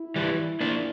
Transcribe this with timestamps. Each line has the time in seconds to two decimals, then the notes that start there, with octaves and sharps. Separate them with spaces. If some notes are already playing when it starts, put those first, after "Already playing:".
Already playing: E4
0.16 E3 G3
0.61 A#3 D4